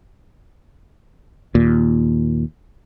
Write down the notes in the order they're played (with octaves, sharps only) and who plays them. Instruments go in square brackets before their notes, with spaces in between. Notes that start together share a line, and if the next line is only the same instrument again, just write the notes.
[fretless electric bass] D#2 A#2